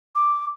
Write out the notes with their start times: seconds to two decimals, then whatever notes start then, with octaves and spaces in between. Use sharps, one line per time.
0.15 D6